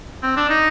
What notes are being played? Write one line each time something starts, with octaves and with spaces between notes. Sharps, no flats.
C4
D4
D#4